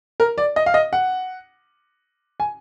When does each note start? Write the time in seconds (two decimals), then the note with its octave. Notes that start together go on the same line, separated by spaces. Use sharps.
0.20 A#4
0.38 D5
0.56 D#5
0.66 F5
0.74 D#5
0.93 F#5
2.40 G#5